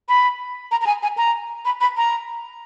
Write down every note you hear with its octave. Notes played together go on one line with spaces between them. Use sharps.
B5
A#5
A#5
G#5
G#5
A#5
B5
B5
A#5